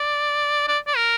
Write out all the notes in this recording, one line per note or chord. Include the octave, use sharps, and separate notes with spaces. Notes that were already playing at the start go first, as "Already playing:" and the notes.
Already playing: D5
D5
D5
A#4